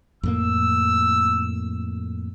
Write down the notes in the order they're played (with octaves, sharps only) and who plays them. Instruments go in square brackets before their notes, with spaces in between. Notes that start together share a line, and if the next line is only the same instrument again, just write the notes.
[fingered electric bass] F2 A2 A#3 [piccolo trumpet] E6